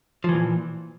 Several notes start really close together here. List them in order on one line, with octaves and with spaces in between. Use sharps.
F3 E3 A#2